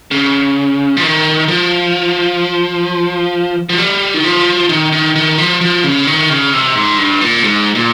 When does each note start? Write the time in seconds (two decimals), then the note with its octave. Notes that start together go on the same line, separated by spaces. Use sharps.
0.11 C#3
0.97 F3
1.03 D#3
1.48 F3
3.69 F3
3.78 G3
4.14 D#3
4.24 F3
4.69 D#3
4.92 D#3
5.16 D#3
5.38 F3
5.61 F3
5.84 C#3
6.07 D#3
6.29 C#3
6.53 C3
6.75 G#2
6.98 G2
7.21 A#2
7.44 G#2
7.75 A#2